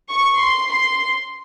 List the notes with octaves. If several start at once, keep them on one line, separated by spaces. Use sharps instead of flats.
C#6
C6
C6